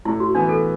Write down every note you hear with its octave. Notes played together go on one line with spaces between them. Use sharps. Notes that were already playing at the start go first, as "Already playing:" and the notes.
A2 E4
F#4
E3 B3 D4
A4